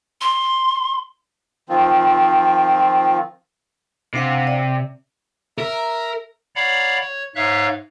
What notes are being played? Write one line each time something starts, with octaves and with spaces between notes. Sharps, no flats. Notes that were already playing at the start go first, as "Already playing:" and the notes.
C6
D#3 F3 C4 F4
C3 D4 F5 F#5
D5
A#4 E5 A#5
C#5 D5 F5 F#5 A#5 B5
C#5
G#2 C#5 E5 F5 F#6